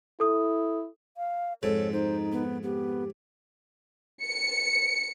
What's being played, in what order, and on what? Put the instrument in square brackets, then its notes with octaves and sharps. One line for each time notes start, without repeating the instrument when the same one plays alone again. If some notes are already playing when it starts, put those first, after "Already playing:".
[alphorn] E4 [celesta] A4 D#6
[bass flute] F5
[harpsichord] F2 G#2 [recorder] A4 [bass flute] C#5
[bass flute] D#4 [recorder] C5
[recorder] B3
[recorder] B3 [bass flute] G4
[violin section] C#7